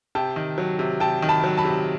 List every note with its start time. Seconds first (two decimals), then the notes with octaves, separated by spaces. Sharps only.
0.15 C3 G5 A5
0.36 D#3
0.58 F#3
0.79 C3
1.00 C3 G5 A5
1.22 D#3
1.29 A5 B5
1.44 F#3
1.58 A5 B5
1.65 C3